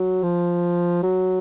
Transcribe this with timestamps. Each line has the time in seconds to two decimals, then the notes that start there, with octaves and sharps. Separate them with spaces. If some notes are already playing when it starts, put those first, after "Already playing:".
Already playing: F#3
0.23 F3
1.03 F#3